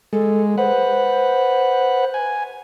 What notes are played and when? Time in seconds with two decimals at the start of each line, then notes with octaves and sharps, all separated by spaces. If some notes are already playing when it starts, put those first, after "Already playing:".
0.13 G#3 A4
0.58 B4 C5 F#5
2.14 G#5